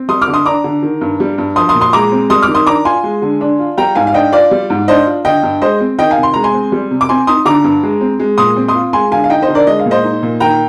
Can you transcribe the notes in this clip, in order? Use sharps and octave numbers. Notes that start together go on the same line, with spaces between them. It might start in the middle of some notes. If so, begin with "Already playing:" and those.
Already playing: C4
G3 C6 D#6
D6 F6
D3
C6 D#6
D4 A#5 D6
D3
D#3
G2
G3
G2
F3 C6 D#6
C6 D#6
A#2
C6 D#6
G#3 A#5 D6
C4
G3 C6 D#6
D6 F6
D#3
C6 D#6
D4 A#5 D6
F4 G#5 C6
G#3
D3
D4
F4
G3 G5 A#5
G#2 F5 G#5
F5
D4 D#5 G5
F4 D5 F5
G3
G#2
D4 C5 D#5
F4
D3 D#5 G5
G2
G#3 C5 D#5
C4
D#3 D#5 G5
F5 G#5
C3
C6
G#3 A#5
G#5 C6
C4
G3
C3
D6
C4 G#5 C6
D#4 C6 D#6
D3 A#5 D6
G2
G#3
C4
G#3
A#2 C6 D#6
C4
C6 D#6
F4
G#3 G#5 C6
D3 F5 G#5
F5
D#4 D#5 G5
C5 D#5
D3
A#4 D5
G#3 D#5
F5
A#2
C5 D#5
D#4
A#2
D#3 G5 A#5